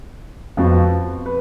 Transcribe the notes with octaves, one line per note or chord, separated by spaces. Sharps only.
F2 F3 B3 F#4
B4